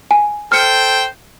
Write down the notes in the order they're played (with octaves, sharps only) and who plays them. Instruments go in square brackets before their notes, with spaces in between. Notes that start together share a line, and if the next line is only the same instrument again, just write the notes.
[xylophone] G#5
[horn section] A4 C5 G5 [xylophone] F6 C#7